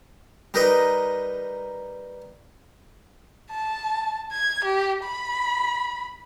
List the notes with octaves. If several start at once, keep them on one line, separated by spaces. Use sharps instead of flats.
G3 D#4 A#4 B4 D#5
A5
G#6
G4
B5